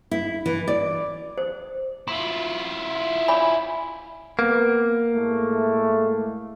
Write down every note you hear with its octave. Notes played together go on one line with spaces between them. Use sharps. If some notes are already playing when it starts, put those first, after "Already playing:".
E4
E3
D5
C5
E4 F4 C6
C#5 G#5 B5
A#3 B3
A2 G#3 A3